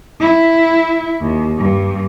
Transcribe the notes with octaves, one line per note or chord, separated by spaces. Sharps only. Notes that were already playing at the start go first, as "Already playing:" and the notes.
E4
D#2
G2